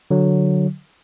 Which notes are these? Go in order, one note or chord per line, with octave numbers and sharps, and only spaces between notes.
D3 F#3